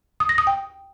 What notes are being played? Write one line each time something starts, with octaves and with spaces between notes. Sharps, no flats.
D#6
A#6
D#6
G5